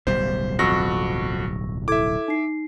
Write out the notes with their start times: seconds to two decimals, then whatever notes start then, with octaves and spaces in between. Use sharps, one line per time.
0.07 D1 B1 G3 C5
0.59 F2 F#4 C#6 E6 A#6
1.88 E4 A4 E5 D6 G#6
2.28 D#4 C7